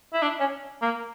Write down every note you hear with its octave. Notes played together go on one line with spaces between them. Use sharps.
E4
D4
C#4
A#3